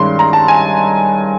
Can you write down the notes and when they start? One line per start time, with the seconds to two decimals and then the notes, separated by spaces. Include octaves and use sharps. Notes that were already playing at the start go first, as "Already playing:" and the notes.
Already playing: G2 D#3 G#3 C#4 C6
0.19 A#5
0.33 A5
0.48 G#5